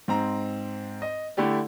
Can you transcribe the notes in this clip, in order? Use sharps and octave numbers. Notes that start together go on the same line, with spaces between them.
G#2 C4 A#5
D#5
D3 A3 E4 G4 D5